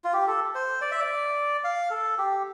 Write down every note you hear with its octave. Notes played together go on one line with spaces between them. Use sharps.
F4
G4
A4
C5
D5
E5
D5
F5
A4
G4